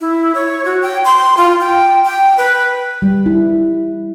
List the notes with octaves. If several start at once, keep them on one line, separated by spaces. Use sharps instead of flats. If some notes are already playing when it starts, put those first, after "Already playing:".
E4
C#5
F#4
G5
C6
F4
G5
G5
B4
G3
E4